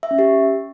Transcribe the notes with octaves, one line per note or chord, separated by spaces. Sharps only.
E5
C#4
G4